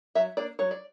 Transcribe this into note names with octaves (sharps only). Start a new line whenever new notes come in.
F#3 E5
A#3 D4 D5
F#3 C#5
D5